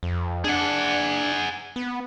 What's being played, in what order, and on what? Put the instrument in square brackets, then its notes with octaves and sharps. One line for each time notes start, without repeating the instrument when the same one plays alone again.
[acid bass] F2
[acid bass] D4 [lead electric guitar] G#4 F#5
[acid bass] B3